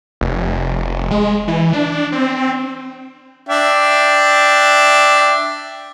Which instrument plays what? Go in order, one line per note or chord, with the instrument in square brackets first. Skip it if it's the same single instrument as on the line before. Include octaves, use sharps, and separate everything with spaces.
[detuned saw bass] F1
G#3
E3
D4
C4
[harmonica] D4 E5 G5